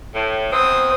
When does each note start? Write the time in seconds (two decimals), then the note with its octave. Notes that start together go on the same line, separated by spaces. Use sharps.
0.14 A2
0.52 E2 C4 C5 D#6